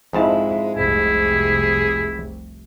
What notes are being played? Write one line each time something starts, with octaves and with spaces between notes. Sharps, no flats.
F2 G#2 G#3 E4 A5
F1 C2 E4 G#4